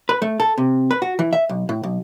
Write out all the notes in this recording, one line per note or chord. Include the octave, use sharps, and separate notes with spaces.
B4
A3
A4
C3
B4
F#4
E3
E5
B1
A2
B1